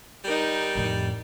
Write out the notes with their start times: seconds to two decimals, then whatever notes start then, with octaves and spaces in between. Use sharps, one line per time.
0.24 G3 D#4 A#4
0.75 F2 A2